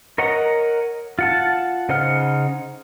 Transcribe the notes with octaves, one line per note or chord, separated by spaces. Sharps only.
A#4 C#5 D#5 F#5 A#5
F4 F#5 A5
C#3 D#4 C5 F#5 F6